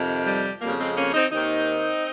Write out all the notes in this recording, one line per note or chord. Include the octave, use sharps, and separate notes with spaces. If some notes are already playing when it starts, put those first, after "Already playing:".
Already playing: F2 C3 D#3
G3
F2 C#3 G3 A#3
G#3 C4
A#3 C#4
C4 D#4
D#2 D#3 C4 D#4